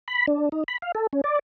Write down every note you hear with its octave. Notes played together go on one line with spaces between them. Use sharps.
B5
D4
D#4
B5
F5
A4
C#4
D5